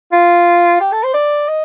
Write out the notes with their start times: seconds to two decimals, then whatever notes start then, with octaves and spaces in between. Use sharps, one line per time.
0.12 F4
0.81 G4
0.92 A4
1.03 C5
1.14 D5
1.48 D#5